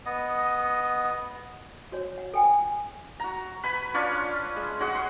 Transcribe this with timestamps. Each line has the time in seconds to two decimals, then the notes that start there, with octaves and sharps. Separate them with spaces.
0.06 B3 D#5
1.92 F#4 C#5 D5
2.18 F#5
2.34 A4 G5 G#5
3.20 F#4 A#5
3.63 B4 G#5 B5
3.94 C#4 D4 F4 C#5
4.56 G#3
4.79 C#4 F#4 G#4 F#5
4.95 C6